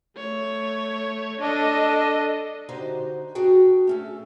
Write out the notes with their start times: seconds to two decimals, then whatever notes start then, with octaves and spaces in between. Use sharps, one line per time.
0.17 A3 C#5
1.40 D4 A4 D#5
2.69 D3 D#4 F#4 G4 C5
3.35 D4 F#4 G#4 G5
3.87 A3 C#4 A4